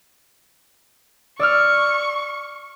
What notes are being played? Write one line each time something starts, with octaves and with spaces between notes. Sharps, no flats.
D5 C#6 E6 F6